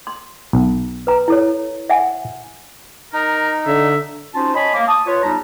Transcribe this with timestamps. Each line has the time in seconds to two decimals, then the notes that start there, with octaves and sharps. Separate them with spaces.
0.07 C6
0.53 B1
1.07 B4 A#5
1.28 E4 A4 C#5
1.89 E5 F#5 G#5
3.13 D#4 A#4
3.66 D3 E5
4.35 C#4 D#4 F4 F#4 C5 A5
4.55 C#5 D#5 G#5 A5 B5
4.74 A#3
4.88 A5 D#6
5.06 F4 B4 C#5
5.23 E2 G3 D#4 A5 A#5